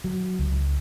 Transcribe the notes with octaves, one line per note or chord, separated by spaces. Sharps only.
F#3
C#2